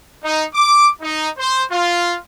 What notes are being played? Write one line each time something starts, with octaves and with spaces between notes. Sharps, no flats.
D#4
D6
D#4
C5
F4